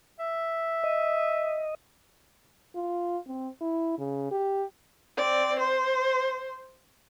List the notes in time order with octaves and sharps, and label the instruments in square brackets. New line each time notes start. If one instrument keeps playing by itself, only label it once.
[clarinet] E5
[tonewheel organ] D#5
[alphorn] F4
C4
E4
C#3
G4
[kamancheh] C4 D5
C5